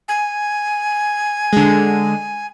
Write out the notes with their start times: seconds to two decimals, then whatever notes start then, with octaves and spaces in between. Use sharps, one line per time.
0.08 G#5
1.53 D3 G#3